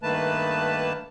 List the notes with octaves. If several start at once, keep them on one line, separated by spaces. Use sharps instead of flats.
G2 D#3 A3 A#3 B4 A5